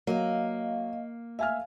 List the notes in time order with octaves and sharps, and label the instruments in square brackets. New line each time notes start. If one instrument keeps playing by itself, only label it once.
[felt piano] F#3 [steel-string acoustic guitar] A#3 [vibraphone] D#5 F5
[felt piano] E5 G#5 F6 [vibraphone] F5